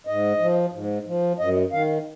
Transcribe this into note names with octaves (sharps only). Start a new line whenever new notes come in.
G#2 D#5
F3
G#2
F3
F#2 D#5
D#3 F5